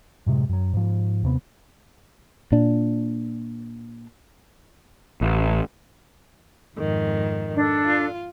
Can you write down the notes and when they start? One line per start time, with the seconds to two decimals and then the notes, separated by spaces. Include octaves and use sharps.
0.26 F#2 A2 C3 G#3
0.49 F#2 F#3
0.73 G#2 F3
1.23 D#2 C3 B3
2.52 A#2 D4
5.21 A1
6.78 F2 G#2 D#3
7.56 D4 A4
7.86 F4